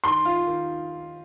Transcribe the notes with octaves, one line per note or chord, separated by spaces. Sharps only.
D#3 C6
F4
D#3